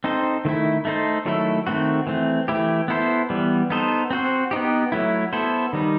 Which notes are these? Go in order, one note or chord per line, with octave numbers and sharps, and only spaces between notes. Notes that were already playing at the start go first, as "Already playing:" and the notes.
C4 D#4 A4 C5
D#3 A3 E4
A3 D#4 A4 C5
D#3 F#3 A3 E4 A4
D#3 A3 C4 F#4
E3 A3 C4
E3 A3 E4 G4
B3 E4 A4 C5
E3 G3 B3
B3 D#4 A4 C5
C4 F#4 C5
B3 D#4 G4
F#3 A3 E4
B3 E4 A4 C5
D#3 G3 D#4